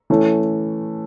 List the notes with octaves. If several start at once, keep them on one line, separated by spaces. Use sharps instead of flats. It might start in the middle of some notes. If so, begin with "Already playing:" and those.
E3 A3 C#4